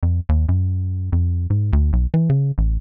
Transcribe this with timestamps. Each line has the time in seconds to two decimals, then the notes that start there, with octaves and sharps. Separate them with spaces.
0.03 F2
0.29 D#2
0.49 F#2
1.12 F2
1.50 G#2
1.73 D2
1.93 B1
2.14 E3
2.30 C#3
2.58 A1